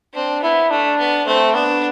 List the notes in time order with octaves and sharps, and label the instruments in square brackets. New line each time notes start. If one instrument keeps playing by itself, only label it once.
[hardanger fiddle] C4 [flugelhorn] D4
[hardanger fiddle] B3 [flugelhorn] E4
[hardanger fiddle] A3 [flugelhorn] D4
[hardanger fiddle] B3
[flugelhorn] A3 [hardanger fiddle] C4
[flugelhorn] B3 [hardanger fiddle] D4